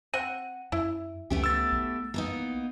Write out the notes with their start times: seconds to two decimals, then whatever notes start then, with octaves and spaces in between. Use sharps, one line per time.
0.14 C4 F#5 D#7
0.72 F#2 E4
1.30 C#2 A3 B3 C#4 G4
1.44 E6 A6
1.72 B1
2.14 A#3 B3 D#4